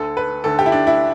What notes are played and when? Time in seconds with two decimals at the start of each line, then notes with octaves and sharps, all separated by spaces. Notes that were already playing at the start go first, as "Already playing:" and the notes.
Already playing: D2 D3 A4
0.17 B4
0.44 D2 D3 A4
0.59 G4
0.66 E4
0.72 D4
0.87 E4